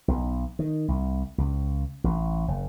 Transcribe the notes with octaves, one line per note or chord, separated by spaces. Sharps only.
B1
D#3
C2
C#2
A1
F#1